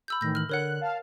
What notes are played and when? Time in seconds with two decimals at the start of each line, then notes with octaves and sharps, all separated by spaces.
0.08 B5 E6 G6
0.21 A2 D#3 E3 G6 A#6
0.35 F6 F#7
0.49 D3 A#4 C#5 F#5 F#6
0.81 F5 A5